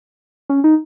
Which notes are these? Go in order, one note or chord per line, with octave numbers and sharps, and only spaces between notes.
C#4
D#4